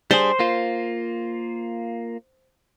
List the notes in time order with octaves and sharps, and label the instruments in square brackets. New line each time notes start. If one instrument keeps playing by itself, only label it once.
[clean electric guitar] G3 D4 G#4 [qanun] C5
[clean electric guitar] A#3 F4